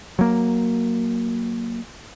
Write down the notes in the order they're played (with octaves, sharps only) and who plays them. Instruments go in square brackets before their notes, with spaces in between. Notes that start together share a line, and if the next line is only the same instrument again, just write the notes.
[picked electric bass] F#3 A#3